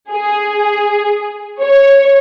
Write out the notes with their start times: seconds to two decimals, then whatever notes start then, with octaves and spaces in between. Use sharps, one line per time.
0.11 G#4
1.60 C#5